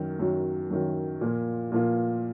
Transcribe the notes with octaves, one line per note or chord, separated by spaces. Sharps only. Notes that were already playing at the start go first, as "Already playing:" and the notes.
Already playing: F#2 D#3 F#3
F#2 D#3 F#3
F#2 D#3 F#3
A#2 F3 A#3 F4
A#2 F3 A#3 F4